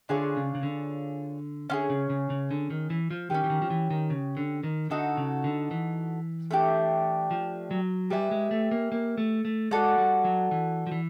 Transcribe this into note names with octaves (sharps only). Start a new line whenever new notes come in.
D3 D4 F4 G#4 C#5
C#3
C#3
D3
D3 C#4 F4 G#4
C#3
C#3
C#3
D3
D#3
E3
F3
D#3 C#4 E4 G4
E3
D#3
F3
E3
D#3
C#3
D3
D#3
D3 D#4 F#4 A4
C#3
D3
E3
A3 D4 G4
F3
F#3
G3 G4 B4 E5 G#5
G#3
A3
A#3
A#3
A3
A3
G#3 F#4 A4 D5 F#5
G3
F#3
E3
F3
E3